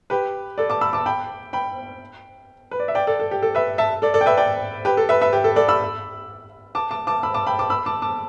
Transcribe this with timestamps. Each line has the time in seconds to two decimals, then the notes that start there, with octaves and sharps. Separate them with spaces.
0.10 G4 B4
0.58 A4 D5
0.70 A5 D6
0.81 B5 E6
0.93 A5 D6
1.06 G5 B5
1.53 G5 B5
2.71 B4
2.80 D5
2.88 E5
2.95 D5 G5
3.07 A4 D5
3.20 A4
3.31 G4
3.42 A4
3.55 B4 E5
3.78 E5 A5
4.02 A4 D5
4.14 A4 D5
4.21 G5
4.26 B4 E5
4.37 D5 G5
4.85 G4 B4
4.97 A4
5.09 B4 E5
5.21 B4 E5
5.33 G4
5.44 A4
5.56 A4 D5
5.69 B5 E6
6.75 A5 D6
6.91 A5 D6
7.07 A5 D6
7.23 B5 E6
7.34 A5 D6
7.47 G5 B5
7.59 A5 D6
7.70 B5 E6
7.86 A5 D6
8.02 A5 D6